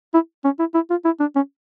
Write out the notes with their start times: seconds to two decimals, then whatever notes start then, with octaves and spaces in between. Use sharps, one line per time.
0.14 E4
0.44 C#4
0.59 E4
0.74 E4
0.90 F4
1.05 E4
1.20 D4
1.36 C#4